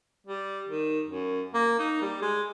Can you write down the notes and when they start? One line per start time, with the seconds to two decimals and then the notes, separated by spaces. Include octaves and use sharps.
0.27 G3
0.69 D#3
1.08 F#2
1.54 A#3
1.79 D#4
2.01 G3
2.22 G#3